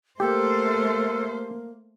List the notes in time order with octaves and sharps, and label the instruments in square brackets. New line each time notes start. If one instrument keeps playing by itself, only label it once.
[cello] A3 C5 [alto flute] A#3 [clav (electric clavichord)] G4 [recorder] A4